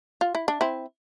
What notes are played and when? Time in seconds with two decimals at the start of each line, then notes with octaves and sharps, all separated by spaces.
0.21 F4
0.35 E4
0.48 D4
0.61 C4 E4